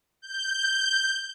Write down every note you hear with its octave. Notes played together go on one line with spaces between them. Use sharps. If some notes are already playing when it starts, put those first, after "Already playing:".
G6